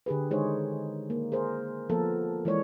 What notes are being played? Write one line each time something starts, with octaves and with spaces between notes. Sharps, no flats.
D3 G4 G#4 B4
D#3 G#3 D#4 G#4 C5 C#5
A#3
G#4 A#4 C5
F3 A#3 B3 F4 A4 A#4
E3 G#3 C#5 D5